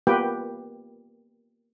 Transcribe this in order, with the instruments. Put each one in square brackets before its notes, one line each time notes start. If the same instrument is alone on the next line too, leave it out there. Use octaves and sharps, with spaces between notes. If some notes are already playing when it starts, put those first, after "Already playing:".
[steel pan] A#3 B3 F4 G4 B4 G5